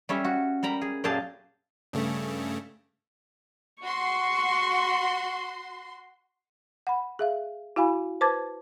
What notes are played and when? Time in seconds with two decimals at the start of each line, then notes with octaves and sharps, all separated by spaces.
0.09 G3 C#4 C#5 E5
0.24 F#4
0.63 G3 A#4 A#5 B5
0.81 G#4
1.04 F#2 A#2 G4 G#4 F5 A5
1.93 G2 C#3 A3
3.83 F#4 C6 C#6
6.87 F#5 B5
7.19 G#4 E5 F5
7.76 E4 F#4 F5 G#5 B5
8.21 B4 C5 A5 D6 G#6 A6